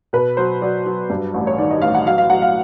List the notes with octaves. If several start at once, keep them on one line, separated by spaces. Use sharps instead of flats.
B2 B4
F#3 C5
F#3 D5
F#3
G2
A1
C#5
D#3 D5
D#5
A1 F5
F#5
F#3 F5
F5
F#3 F#5
F5